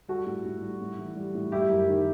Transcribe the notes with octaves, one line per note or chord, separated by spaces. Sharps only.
G3 F#4 A4
A2
A2
G3
A2
E3
G3
A2
G3 E4 G4
F#2
D#3